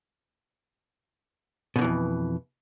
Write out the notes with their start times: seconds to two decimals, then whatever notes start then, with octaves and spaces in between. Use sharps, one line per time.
1.76 B2
1.79 D3
1.82 E3
1.84 F2